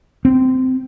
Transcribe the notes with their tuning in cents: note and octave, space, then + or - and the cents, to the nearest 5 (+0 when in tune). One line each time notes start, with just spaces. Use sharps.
C4 -20